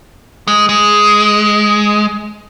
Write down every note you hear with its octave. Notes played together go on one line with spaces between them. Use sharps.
G#3
G#3